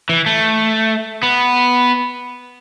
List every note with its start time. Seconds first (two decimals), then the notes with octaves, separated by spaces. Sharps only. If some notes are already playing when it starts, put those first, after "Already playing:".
0.09 E3
0.26 A3
1.23 B3